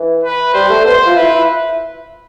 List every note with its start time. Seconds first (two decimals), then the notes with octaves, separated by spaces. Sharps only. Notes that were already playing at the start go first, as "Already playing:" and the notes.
Already playing: E3
0.24 B4
0.54 G3 C5
0.70 A3
0.85 B3 C5
1.06 F4
1.16 E4 B4
1.35 E4